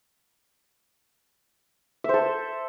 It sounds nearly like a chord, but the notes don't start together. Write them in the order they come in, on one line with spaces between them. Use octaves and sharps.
E5 C5 A4